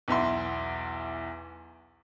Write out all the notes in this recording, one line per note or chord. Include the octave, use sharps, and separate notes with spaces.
B1 E2 E5 C6